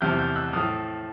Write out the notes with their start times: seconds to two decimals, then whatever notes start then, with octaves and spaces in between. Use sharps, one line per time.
0.01 E2 C3 F3 F6 G6
0.18 F6 G6
0.36 E6 F#6
0.53 A2 F3 D#6 F6